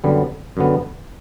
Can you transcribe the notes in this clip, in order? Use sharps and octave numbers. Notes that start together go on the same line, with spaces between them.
F#2 D3 G3 B3
F#2 D3 G3 B3